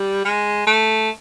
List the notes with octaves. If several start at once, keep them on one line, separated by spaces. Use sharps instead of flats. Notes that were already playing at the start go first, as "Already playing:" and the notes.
Already playing: G3
G#3
A3